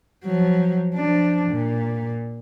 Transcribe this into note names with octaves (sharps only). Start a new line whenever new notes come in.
F3 F#3
F3 D4
A#2